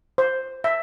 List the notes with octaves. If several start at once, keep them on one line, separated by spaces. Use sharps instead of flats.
C5
E5